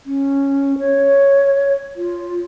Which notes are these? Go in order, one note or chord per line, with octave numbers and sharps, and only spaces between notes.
C#4
C#5
F4